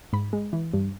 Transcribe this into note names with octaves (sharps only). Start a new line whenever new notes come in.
G#2 B5
G#3
E3
G2